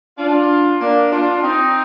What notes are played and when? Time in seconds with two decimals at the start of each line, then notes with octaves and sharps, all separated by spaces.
0.18 D4 F4
0.81 A#3 D4
1.12 D4 F4
1.43 C4 D#4